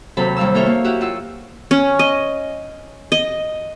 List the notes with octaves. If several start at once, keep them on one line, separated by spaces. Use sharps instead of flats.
D#2 C3 F#3 A4 A5 B5
D#2 D#3 G3 F5 A5 E6
A#3 D#4 A4 C#5 E5 F5
A#3
E4 F#4 G4 E5 F#5
F4 F#5 E6
C#4
D#5
D#5